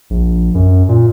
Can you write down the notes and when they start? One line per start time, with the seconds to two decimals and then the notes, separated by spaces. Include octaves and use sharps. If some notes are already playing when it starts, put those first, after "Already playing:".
0.10 A#1
0.54 F#2
0.89 A#2